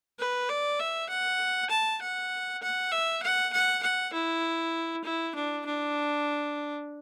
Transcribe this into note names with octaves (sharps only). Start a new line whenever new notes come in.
B4
D5
E5
F#5
A5
F#5
F#5
E5
F#5
F#5
F#5
E4
E4
D4
D4